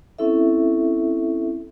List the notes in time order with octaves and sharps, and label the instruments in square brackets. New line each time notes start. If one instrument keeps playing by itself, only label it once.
[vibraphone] C4 C#4 E4 A4 E5